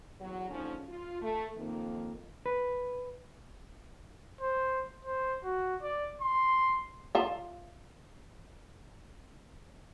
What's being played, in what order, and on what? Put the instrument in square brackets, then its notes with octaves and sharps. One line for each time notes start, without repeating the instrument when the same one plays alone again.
[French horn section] E2 F#3
D#2 G#2 D3 F3 C#4
F4
A3
F2 D#3 A#3
[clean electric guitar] B4
[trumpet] C5
C5
F#4
D5
C6
[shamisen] F4 E5